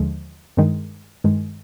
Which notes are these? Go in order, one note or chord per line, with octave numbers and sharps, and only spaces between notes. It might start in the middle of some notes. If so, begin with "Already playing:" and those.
Already playing: D#2 D3 F3 G#3
G2 D#3 G#3
G2 D#3 G#3